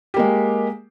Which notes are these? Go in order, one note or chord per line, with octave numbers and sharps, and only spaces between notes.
G#3 A#3 G4